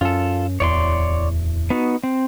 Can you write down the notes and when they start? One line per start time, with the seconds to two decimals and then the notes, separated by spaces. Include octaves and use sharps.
0.01 F#2 C#4 F4 A4
0.60 D1 E2 C#5 D5 C6
1.70 B3 D#4 F#4
2.04 C4